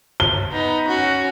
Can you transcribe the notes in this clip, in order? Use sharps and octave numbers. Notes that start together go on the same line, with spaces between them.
G7
B3 D#4
C#4 F#4